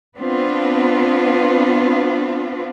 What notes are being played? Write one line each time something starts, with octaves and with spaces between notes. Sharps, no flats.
B3 C4 D4 F4 B4